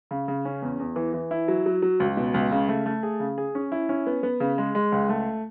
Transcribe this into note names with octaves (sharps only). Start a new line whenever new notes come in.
C#3
C#3
C#4
E2
E2
E3
E3
E4
F#3
F#3
F#3
C#2
B2
C#2
C#3
A3
A3
G#4
C#3
G#4
C#4
E4
C#4
B3
B3
C#3
G#3
G#3
C#2
A3